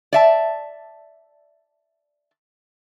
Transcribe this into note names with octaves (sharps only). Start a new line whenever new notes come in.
D5 E5 A5